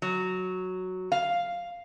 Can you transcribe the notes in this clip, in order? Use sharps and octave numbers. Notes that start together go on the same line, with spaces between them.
F#3
F5